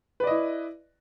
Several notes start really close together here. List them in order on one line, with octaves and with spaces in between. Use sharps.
B4 D5 D#5 E4